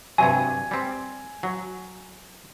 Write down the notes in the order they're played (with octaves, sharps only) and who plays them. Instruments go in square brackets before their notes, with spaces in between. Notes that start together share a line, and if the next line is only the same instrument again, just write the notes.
[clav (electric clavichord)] G2 C3 F#3 [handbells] G#5
[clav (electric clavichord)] G3 C4
F#3